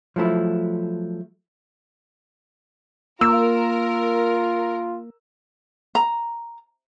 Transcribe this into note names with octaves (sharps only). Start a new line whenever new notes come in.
F3 F#3 A3 E4
A#3 F4 A#4 E6
A#5